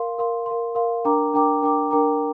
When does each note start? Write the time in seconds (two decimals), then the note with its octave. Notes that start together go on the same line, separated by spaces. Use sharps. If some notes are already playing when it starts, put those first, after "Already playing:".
Already playing: A#4 F5 C6
0.18 A#4 F5 C6
0.46 A#4 F5 C6
0.75 A#4 F5 C6
1.05 D4 A#4 G5 A#5 D6
1.34 D4 A#4 G5 A#5 D6
1.62 D4 A#4 G5 A#5 D6
1.91 D4 A#4 G5 A#5 D6